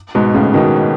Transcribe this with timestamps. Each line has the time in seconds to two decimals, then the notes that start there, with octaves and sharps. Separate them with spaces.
0.15 G#2 B2
0.34 A2 C#3
0.54 B2 D#3